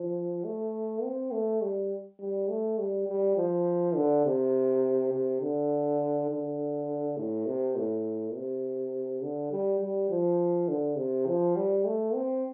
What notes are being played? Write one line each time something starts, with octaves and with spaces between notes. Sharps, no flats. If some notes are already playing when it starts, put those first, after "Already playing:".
Already playing: F3
A3
C4
A3
G3
G3
A3
G3
G3
F3
D3
C3
C3
D3
D3
A2
C3
A2
C3
D3
G3
G3
F3
D3
C3
F3
G3
A3
C4